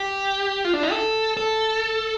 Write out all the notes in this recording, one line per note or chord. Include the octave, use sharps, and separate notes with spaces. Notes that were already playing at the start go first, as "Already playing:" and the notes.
Already playing: G4
F4
D4
D#4
A4
A4